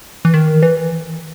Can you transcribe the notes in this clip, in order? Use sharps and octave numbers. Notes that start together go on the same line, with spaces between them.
E3
D#3
E3